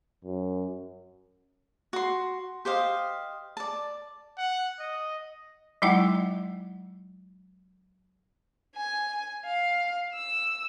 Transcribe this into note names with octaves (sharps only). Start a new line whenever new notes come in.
F#2
F#4 C6
G4 C5 D#5 F5
D5 A5
F#5
D#5
F#3 G#3 D#4 E4 F#5 G5
G#5
F5
E6